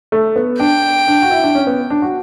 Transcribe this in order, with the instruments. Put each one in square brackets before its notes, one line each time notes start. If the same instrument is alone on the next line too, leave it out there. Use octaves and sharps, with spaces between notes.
[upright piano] A3
B3
[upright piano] D4 [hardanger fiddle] G5
[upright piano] D4
F#4
E4
D4
C#4
B3
D4
F#4